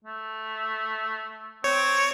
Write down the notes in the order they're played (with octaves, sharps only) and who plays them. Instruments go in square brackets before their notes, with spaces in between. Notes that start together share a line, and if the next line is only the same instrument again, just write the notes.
[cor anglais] A3
[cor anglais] C4 [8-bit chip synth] C#5